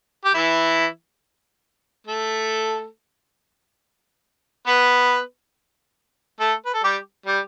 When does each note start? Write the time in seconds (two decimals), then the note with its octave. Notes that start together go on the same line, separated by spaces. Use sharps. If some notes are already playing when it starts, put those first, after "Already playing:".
0.25 G4
0.34 E3 E4
2.07 A3 A4
4.67 B3 B4
6.40 A3 A4
6.65 B4
6.74 A4
6.83 G3 G4
7.26 G3 G4